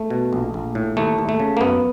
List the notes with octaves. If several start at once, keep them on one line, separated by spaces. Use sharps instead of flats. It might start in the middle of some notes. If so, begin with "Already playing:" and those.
Already playing: A3
B2
A#1
A#1
A2
D#2 A3
D#2
A3
C#3
A#3
F#2 B3